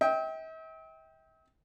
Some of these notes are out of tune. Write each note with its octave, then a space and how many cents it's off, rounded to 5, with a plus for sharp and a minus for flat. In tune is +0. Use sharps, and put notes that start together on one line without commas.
E5 -45 G5 +0